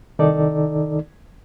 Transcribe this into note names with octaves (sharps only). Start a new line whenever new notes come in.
C2 D#3 D#4 A4 D5